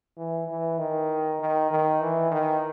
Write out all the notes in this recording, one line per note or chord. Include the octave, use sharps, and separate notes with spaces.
E3
E3
D#3
D#3
D#3
E3
D#3